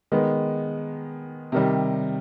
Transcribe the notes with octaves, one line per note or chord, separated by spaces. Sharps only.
D#3 G#3 B3
C3 D#3 G3